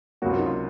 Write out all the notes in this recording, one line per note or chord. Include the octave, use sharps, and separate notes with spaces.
C#2 C3 F#3 A#3 F#4
F4
D#4
F4